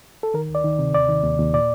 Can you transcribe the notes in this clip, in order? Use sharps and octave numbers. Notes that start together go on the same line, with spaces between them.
A4
D#3 A#4
D2
D5
D#3
C3
D#2 D5
D#3
D#2
D#2
A#2 D5